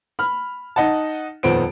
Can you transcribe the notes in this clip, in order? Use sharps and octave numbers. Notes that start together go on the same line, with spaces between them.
B5 F6
D#4 D#5 F#5 A5
D#1 F2 B3 C5 D7